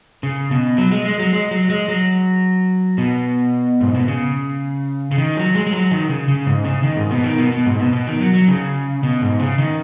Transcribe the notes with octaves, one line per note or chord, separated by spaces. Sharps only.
C#3
B2
F#3
G#3
G#3
F#3
G#3
F#3
G#3
F#3
B2
G#2
B2
C#3
C#3
D#3
F#3
G#3
G#3
F#3
D#3
C#3
C#3
G#2
C#3
D#3
G#2
B2
D#3
B2
B2
G#2
B2
B2
D#3
F#3
F#3
C#3
B2
G#2
C#3
D#3